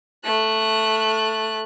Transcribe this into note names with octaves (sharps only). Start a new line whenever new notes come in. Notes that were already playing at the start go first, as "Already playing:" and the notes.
A3 F#6